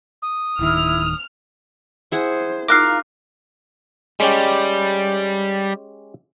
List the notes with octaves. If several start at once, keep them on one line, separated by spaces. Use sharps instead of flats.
D#6
D1 D#3 E4 F6
E4 G#4 C5 F#5
D#4 F4 A#4 F5 D6 F6 F#6 C7
G3 G#3 C#4 G4